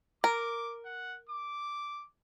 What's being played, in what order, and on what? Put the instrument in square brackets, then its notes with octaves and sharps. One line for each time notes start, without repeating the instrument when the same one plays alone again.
[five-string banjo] A#4 [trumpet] D6
[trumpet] F#5
D6